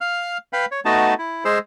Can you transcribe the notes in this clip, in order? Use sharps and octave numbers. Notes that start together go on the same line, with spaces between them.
F5 F6
B4 F5 G5 B5
C#5
A3 B3 D#4 F#4 D#5 A5
E4
G#3 G#4 C5 E6